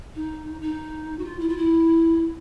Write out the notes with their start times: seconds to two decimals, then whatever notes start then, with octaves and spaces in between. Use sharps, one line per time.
0.15 D#4
0.61 D#4
1.19 F#4
1.24 F4
1.39 E4
1.48 F4
1.57 E4